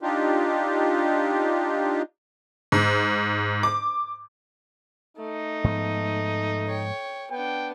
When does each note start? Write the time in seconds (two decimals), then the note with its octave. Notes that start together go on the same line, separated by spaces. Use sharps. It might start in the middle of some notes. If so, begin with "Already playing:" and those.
0.01 D4 D#4 F4 G4
2.72 G#2
3.63 D6
5.17 A3 D#4
5.64 G#2 F3 B3
6.68 C#5 G5
7.32 B3 D4 G5